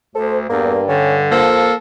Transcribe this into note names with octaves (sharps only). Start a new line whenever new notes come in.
D2 A4 C5
E2 G2 A#3
D3 C#4
F3 A#3 A4